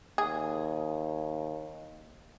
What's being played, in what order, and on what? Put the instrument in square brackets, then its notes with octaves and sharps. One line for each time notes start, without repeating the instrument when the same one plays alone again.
[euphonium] D#2 [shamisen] G#4